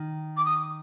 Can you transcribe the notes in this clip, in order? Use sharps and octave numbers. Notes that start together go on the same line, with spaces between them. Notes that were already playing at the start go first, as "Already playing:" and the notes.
Already playing: D#3
D6
D#6